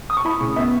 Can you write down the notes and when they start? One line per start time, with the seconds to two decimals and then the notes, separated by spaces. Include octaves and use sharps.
0.10 D#6
0.17 C#6
0.25 E4 B5
0.40 C#3 C#6
0.56 B3 E5